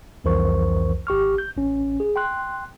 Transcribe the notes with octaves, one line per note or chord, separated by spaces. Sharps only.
C2 F2 E3 A#4 C5 C#6
G#1 G4 C#6 F6
G6
A1 C#4
G#4
G5 C6 F#6